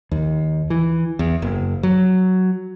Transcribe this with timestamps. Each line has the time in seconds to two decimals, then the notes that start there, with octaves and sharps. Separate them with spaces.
0.11 D#2
0.70 E3
1.19 E2
1.42 F#1
1.83 F#3